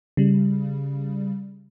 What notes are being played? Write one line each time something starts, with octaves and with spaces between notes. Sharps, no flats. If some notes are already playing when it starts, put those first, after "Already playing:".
C#3 G3